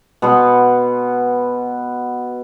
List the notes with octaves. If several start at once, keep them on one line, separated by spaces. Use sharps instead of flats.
B2 B3 F#5 C6